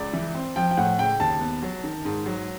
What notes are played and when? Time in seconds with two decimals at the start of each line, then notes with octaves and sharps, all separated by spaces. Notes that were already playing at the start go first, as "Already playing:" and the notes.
Already playing: C#2 D5
0.13 E3
0.35 C4
0.56 F3 G5
0.71 G5
0.77 A2 F#5
0.98 C#3 G5
1.20 D#2 A5
1.40 B3
1.63 F#3
1.84 D#3
2.05 G#2
2.26 F#3